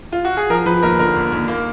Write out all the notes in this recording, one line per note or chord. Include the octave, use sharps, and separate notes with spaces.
F4
F#4
G#4
F3 A#4
F3 B4
D#2 A#4
D3 A#4
D#2
D#2
A#3